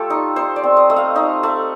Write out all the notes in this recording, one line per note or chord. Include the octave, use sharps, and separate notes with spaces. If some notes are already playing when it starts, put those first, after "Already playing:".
Already playing: A3 F4 G4 A4
D#4
D#4 C5
D5
C4
D#5
A3 D#5
F5
D#4 D#5
A3